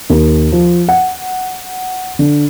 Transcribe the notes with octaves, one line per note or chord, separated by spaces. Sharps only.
D#2
F3
F#5
D3